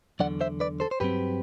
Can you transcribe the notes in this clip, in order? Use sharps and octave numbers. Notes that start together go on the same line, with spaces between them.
E2 D3 F#3 D5 F#5
C5 E5
B4 D5
A4 C5
C5
G2 F#3 C4 G4 B4